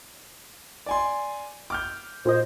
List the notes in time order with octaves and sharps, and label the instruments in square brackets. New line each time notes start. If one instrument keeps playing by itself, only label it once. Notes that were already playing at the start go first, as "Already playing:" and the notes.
[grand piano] D5 G#5 C6
D6 F6 G6
[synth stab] A#2 F4 D#5 [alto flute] C5